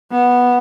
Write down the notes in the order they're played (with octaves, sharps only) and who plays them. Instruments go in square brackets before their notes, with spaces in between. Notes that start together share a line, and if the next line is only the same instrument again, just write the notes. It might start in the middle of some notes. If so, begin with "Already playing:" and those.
[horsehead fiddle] B3